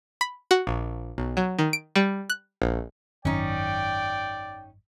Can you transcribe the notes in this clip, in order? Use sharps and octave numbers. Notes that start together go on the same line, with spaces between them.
B5
F#4
A#1
B1
F#3
D#3
D7
G3
F#6
A#1
G#1 F#2 D#3 C#4 D#4 D5 G5